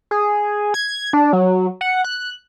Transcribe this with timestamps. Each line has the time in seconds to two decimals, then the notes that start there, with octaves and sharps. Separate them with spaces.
0.11 G#4
0.74 G#6
1.13 D4
1.33 F#3
1.81 F#5
2.04 F#6